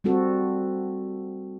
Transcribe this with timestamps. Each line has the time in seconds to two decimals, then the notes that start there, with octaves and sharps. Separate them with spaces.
0.04 G3 A3 C4 F#4 A4